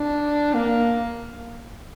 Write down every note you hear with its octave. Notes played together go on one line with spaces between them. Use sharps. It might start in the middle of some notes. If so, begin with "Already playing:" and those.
Already playing: D4
A#3